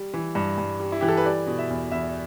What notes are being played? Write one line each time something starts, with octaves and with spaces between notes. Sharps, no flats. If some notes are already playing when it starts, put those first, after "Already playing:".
Already playing: G3
E3
G2
G2
G3
E4
E3 G4
A4
B4
G3 D5
B2
E5
E2
E2 E5